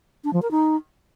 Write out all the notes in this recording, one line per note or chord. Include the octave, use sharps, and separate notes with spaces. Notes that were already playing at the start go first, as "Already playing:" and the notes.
D4
F3
A#4
D#4